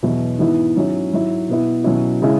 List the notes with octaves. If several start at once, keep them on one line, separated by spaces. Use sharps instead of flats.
E2 B2 F#3 E4
G#2 E3 B3 E4
G#2 F#3 C#4 E4
G#2 F#3 E4
B2 B3 E4
B2 F#3 C#4 E4
C#3 G#3 E4